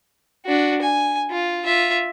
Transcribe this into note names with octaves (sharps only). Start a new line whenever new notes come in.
D4 F#4
G#5
F4
F4 E5